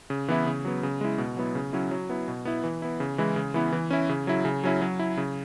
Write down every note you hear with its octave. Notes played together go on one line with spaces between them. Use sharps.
C#3
E3 B3 E4
C#3
F#3 B3
C#3
G#3 E4
B2
F#3 B3 E4
C#3
F#3 C#4 E4
F#3
B3 E4
B2
B3 E4
E3
B3 E4
C#3
E3 G#3 E4
C#3
E3 B3 E4
E3
C#4 E4
C#3
F#3 E4
C#3
F#3 C#4 E4
F#3
E4
C#3